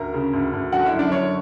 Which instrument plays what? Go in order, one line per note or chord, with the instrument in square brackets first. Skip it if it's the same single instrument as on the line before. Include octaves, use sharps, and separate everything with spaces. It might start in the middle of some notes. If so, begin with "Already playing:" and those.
Already playing: [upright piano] D2 A#4 A#5
C#3
D2
D2
D3 F#4 F#5
E4 E5
F#2
D4 D5
D3 C#5